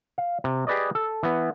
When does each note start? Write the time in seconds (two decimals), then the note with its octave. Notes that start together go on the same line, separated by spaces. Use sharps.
0.18 F5
0.44 C3
0.67 G4 G#4 B4 D5 D#5
0.95 A4
1.23 E3 B3